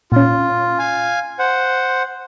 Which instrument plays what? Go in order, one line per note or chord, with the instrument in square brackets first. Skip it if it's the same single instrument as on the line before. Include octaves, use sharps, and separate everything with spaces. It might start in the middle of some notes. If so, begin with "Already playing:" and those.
[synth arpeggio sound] A#2 C#4 [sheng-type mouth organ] F4
[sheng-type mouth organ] F5 G#5
C5 F#5